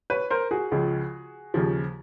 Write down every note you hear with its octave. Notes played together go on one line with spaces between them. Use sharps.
B4 C#5
A#4 C5
F#4 G#4
C#2 C#3 F3
D#2 C#3 F3